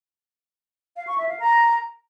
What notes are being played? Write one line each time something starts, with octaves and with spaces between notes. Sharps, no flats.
F5
C#6
E5
F5
A#5